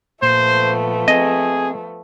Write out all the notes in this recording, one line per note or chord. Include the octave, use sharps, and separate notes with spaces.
A#2 F3 A3 B3 C5
C4 G#4 D#5